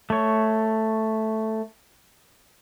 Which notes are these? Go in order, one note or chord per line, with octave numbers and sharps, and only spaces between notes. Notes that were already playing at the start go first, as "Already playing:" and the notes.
A3 C#5